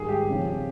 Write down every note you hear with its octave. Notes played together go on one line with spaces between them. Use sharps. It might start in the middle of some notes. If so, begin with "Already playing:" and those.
Already playing: G#2 D#3 G3 G#4
G4
F2 C#3 F3